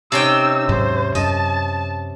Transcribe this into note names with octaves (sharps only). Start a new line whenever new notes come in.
C3 C#4 D#4 G5 E6
D#2 G#2 F#3 C5
F#2 D#5 A5